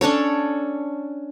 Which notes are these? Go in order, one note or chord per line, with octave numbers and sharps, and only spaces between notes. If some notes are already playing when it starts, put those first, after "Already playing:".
C#4 D4 A4 C#5